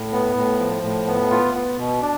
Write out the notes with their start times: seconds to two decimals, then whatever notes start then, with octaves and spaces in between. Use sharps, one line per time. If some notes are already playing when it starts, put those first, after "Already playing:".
Already playing: A2
0.13 B3
0.36 A2
0.60 F3
0.83 A2
1.07 B3
1.31 F4
1.55 B3
1.78 B2
2.02 D4